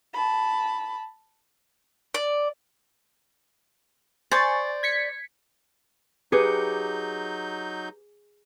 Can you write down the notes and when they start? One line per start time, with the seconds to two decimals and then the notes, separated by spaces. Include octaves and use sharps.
0.14 A5 B5
2.14 D5
4.32 C5 D5 G#5 C#6 A6
4.83 G#6 B6 C#7
6.32 F#3 D#4 G4 G#4 B4 D6 G6 C#7